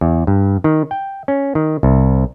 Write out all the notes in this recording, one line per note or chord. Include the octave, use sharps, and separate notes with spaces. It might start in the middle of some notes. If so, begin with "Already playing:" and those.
E2
G2
D#3
G5
C#4
D#3
C2